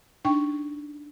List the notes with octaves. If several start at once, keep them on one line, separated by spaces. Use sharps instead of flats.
D4 D#4 G5 C#6